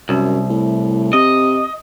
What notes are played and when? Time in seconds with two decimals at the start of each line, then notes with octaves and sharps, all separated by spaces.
0.09 C2 F#2
0.50 A2
1.13 C3 D#5